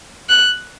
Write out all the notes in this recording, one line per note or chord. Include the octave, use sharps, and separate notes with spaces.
F#6